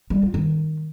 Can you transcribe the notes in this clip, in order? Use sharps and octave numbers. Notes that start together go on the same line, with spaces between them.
G3
F4
D#3